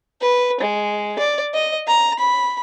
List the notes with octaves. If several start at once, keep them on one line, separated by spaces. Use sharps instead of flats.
B4
G#3
D5
D#5
A#5
B5